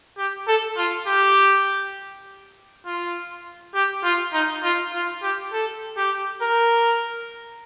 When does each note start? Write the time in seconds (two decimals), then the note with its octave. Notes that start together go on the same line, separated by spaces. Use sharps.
0.18 G4
0.47 A4
0.77 F4
1.07 G4
2.86 F4
3.75 G4
4.04 F4
4.33 D#4
4.63 F4
4.93 F4
5.23 G4
5.52 A4
5.97 G4
6.42 A#4